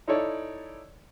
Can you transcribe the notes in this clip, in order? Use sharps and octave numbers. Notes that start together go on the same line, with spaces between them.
D#4 E4 A4 C#5 D5